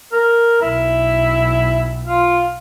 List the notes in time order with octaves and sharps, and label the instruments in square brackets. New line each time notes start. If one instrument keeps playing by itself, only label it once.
[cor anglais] A#4
[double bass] B1 [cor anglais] E4
[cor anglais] F4